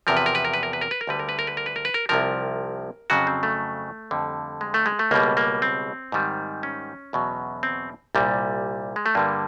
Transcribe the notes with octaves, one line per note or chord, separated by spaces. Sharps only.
E2 C3 F3 A#4
B4
A#4
B4
A#4
B4
A#4
B4
A#4
B4
A#4
D2 D3 G3 B4
A#4
B4
A#4
B4
A#4
B4
A#4
B4
A#4
C2 C3 F3 A#4
F2 C#3 F#3 F#4
C4
A3
F2 D3 G3
G#3
A3
G#3
A3
C#2 B2 G3 A#3
A#3
C4
G#2 D#3 G3
C#4
E2 B2 F#3
C4
C2 A#2 G3
G#3
A3
G2 D3 G3 A#3